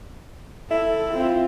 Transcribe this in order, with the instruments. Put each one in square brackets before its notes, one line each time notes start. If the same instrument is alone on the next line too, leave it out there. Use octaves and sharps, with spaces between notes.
[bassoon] E4 [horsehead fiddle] A4
[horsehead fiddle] C4 F4